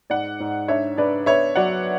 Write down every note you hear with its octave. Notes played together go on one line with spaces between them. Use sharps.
G#2 D5 F#5
G#2
D4 C#5 E5
D4 B4 D5
B3 C#5 E5
F#3 D5 F#5